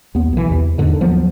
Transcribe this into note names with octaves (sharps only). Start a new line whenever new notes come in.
D#2 B3
B1 E3
E2 C3
E2 G#2 D3 D#3
D#2 F3 F#3 B3